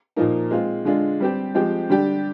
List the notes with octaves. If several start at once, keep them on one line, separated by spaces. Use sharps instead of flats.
A#2 F3 A#3 D#4
G#3 C4 F4
D3 G#3 D4 F4
G3 C4 G4
F3 G#3 C4 G4
D3 G3 D4 G4